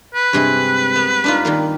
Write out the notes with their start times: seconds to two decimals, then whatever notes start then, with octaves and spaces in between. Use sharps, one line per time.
0.15 B4
0.33 G2 C3 G#3
0.95 B3
1.24 D4 D#4 F4
1.45 D#3 G3 A#3